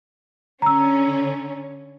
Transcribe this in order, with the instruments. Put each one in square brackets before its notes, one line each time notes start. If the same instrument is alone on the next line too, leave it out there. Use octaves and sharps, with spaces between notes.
[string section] D3 C#4 [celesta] A#5 E6